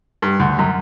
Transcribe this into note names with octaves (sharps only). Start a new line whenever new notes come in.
G2
D2
F#2